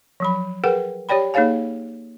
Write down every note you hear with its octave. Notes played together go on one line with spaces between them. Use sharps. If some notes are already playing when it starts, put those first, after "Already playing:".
F3 F#3 B5
G#4 A#4 B4 F#5 G5
G4 C#5 D5 G5 B5
A#3 D#4 G#4 C#5 F5 G#5